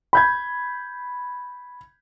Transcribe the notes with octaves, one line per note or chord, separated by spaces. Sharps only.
B5 G6 G#6